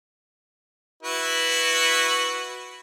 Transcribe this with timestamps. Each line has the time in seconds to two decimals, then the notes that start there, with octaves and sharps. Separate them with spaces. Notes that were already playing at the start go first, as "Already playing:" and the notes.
1.03 E4 F#4 B4